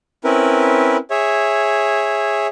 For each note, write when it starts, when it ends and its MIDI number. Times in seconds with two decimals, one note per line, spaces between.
0.24 0.97 60
0.24 0.97 61
0.24 0.97 64
0.24 0.97 70
0.24 0.97 71
1.10 2.47 68
1.10 2.47 73
1.10 2.47 76